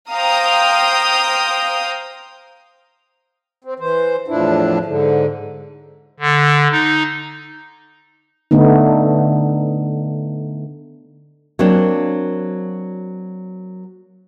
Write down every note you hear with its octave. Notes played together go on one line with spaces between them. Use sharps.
C5 F5 G5 A#5 D#6
C4
E3 C5
E2 A2 F3 D4 E4
G#2 D3
D3
D#4
D3 A3 B3 D#4
F#3 A#3 C4 D4